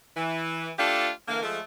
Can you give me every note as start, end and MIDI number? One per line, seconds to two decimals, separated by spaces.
0.17 0.71 52
0.79 1.10 57
0.79 1.10 62
0.79 1.10 65
0.79 1.10 67
0.79 1.10 69
1.28 1.42 50
1.28 1.42 52
1.28 1.42 58
1.43 1.60 53
1.43 1.60 56
1.43 1.60 57